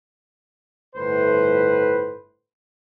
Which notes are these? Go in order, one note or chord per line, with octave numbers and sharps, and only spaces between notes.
G1 A2 B4 C5